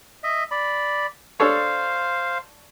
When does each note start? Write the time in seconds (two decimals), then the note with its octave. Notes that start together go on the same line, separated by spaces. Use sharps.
0.24 D#5 E5
0.51 D5 B5
1.40 D4 A4 C5 C#5 F5